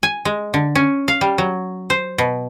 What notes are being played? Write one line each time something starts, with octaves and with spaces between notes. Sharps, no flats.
G#5
G#3
D3
C#4
F5
G3
F#3
C5
B2